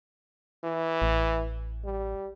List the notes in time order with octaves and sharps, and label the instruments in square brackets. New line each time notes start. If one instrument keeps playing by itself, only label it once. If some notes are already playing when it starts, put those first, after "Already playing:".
[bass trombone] E3
[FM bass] A1
[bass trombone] G3